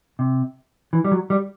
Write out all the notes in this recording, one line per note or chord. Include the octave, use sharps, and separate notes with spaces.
C3
E3
G3
F#3
G3